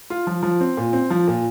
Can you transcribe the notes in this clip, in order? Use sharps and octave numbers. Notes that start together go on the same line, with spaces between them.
F4
F3
F3
C4
A#2
C4
F3
A#2